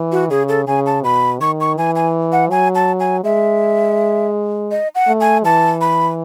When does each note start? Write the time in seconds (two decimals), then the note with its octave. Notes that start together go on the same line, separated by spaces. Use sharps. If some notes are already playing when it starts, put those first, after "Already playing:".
Already playing: E3
0.12 F#4
0.30 C#3 G#4
0.49 A4
0.67 C#3 G#5
0.86 A5
1.04 B2 B5
1.40 D#3 C#6
1.61 C#6
1.78 E3 G#5
1.96 G#5
2.32 F#5
2.50 F#3 G#5
2.75 A5
3.00 G#5
3.24 G#3 E5
4.71 D#5
4.95 F#5
5.08 A3
5.21 G#5
5.44 E3 A5
5.81 B5